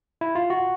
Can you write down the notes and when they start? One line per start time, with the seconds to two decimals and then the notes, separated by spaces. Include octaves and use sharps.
0.21 E4
0.35 F4
0.50 F#4